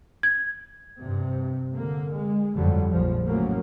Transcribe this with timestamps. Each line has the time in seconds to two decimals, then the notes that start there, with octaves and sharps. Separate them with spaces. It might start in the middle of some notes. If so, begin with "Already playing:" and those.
0.23 G#6
0.99 G2 C3
1.72 D3 A#3
2.12 G#3
2.55 G1 F2 D3 F#3 G3
2.90 A#1 F3
3.24 A2 C#3 F#3 A#3